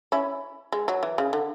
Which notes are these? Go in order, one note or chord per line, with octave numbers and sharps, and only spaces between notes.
C#4 E4
G#3
F#3
E3
C#3
D3